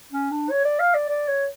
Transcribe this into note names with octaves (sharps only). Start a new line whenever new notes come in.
C#4
D4
C#5
D5
F5
D5
D5
C#5